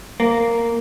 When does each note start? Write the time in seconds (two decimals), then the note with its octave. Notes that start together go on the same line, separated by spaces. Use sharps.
0.20 A#3